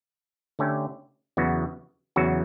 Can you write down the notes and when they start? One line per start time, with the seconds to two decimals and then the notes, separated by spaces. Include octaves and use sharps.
0.59 D3 A3 C#4 G4
1.37 E2 C#3 F#3 B3 F#4
2.16 E2 C#3 F#3 B3 F#4